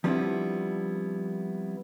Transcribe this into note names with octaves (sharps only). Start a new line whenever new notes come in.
F3 G3 B3 C4 D4 E4